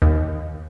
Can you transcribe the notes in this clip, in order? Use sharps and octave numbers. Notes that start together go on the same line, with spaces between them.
D#2